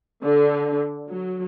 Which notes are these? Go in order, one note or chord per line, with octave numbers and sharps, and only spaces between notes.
D3
F#3